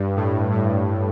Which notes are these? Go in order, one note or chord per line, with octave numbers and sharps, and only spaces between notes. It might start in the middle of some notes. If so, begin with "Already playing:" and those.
Already playing: G2
A2
A2